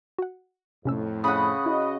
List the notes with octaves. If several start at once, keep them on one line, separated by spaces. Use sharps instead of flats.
F#4 F#5
F2 A2 C3 C#4 E6
C#3 F#5 B5 D#6
E4 F#4 D#5